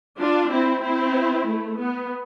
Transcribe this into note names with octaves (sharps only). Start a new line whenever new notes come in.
D4 F4
C4 E4
C4 E4
A3
B3